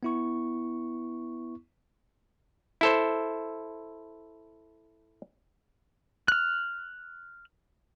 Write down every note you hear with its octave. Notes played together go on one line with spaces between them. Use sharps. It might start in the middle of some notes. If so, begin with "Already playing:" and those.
B3 E4 C#6
E4 A4 C5
F6 F#6